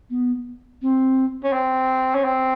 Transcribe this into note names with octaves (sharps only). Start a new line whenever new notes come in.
B3
C4
C#4
C4
C#4
C4